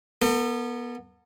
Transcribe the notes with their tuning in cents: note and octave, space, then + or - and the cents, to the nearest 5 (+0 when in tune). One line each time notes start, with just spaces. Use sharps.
B3 -25 A4 +40